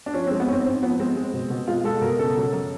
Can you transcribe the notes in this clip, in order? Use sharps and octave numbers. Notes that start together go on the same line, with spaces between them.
D4
F3 C#4
G#3 C4
B3
G#2 C4 C#4
G#2 C4
F3 B3
G#3 C4
G#3
B2
B2
G#3 F4
G#3 A4
B2 A#4
C#3 A4
F#3
F#2